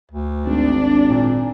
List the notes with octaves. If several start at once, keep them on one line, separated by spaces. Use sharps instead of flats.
D2
G#1 D4
A#2